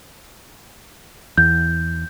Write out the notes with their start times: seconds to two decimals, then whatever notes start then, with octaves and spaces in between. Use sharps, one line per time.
1.37 E2 G6